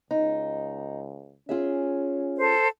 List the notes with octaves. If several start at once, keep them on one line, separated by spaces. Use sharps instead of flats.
C#2 D#4
C#4 F4 G#4 E5
A4 C5